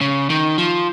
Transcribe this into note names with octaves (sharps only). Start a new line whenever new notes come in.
C#3
D#3
F3